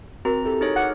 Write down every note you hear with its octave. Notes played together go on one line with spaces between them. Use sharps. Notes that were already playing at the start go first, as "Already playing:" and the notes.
C4 F#4 A#4 A#5
E4 G4 A4
D#4 G#4 C#5
F#5 D6 F6